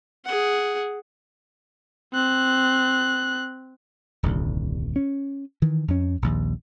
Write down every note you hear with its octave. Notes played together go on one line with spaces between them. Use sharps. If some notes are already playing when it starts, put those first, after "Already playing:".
G#4 F#5
C4 F#6
D#1 C2 G2 D3
C#4
D#3 E3
F2 C#4
A#1 D#2